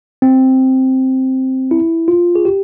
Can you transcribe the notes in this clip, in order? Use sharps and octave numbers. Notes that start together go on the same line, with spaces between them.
C4
E4
F4
G#4
G4